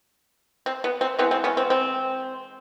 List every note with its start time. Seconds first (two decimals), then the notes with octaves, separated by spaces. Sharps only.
0.66 C4
0.84 B3
1.01 C4
1.18 E3 G#3 B3 C4
1.31 C4
1.44 B3 C#4
1.57 C4
1.70 C4